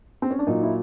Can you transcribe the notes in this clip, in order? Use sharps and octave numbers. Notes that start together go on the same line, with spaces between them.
C4
C#4
D4
A#2 F#3 D#4
E4